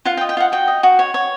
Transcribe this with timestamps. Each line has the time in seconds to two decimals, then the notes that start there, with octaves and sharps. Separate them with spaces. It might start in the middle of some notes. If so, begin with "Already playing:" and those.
0.05 F4 F#5
0.17 G5
0.21 D#5
0.29 G5
0.37 F4 F#5
0.52 F#4 G5
0.68 D#5
0.83 F#4
0.99 C#5
1.14 C#5